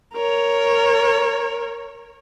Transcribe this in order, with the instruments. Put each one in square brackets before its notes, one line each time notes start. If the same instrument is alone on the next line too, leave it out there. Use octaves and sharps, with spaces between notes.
[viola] A#4 C#5